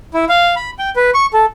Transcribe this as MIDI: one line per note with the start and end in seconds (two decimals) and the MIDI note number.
0.14 0.25 64
0.29 0.55 77
0.56 0.71 83
0.79 0.90 79
0.96 1.10 71
1.14 1.26 85
1.33 1.46 69